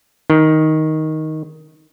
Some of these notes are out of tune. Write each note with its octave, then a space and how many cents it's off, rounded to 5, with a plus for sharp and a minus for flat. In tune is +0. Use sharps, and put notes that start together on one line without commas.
D#3 +10